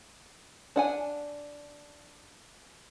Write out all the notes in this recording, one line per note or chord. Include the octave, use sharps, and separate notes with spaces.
D4 F#5 G#5